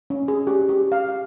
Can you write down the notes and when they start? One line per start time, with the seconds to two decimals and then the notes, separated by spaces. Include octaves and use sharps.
0.10 C#4
0.28 G#4
0.47 G4
0.69 G4
0.92 F5
1.09 F5